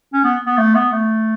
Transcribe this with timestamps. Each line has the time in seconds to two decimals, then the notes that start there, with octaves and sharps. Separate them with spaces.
0.13 C#4
0.24 B3
0.46 B3
0.57 A3
0.75 B3
0.92 A3